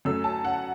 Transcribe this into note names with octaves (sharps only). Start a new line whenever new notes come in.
F#2 F#3 A3 E6
A5
F#5